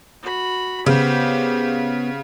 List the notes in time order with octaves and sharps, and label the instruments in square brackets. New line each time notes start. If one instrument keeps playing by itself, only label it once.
[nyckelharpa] F#4 B5
[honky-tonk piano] C#3 [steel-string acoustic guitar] B3 [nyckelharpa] G4 C5